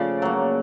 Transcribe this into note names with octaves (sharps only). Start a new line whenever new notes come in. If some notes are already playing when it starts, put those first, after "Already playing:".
Already playing: C#3 F3 A3 D5
F#3 A#3